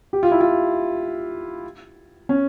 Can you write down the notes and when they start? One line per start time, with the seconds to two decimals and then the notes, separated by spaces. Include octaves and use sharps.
0.13 G4
0.23 F4
0.31 E4
0.41 F4
2.29 C#4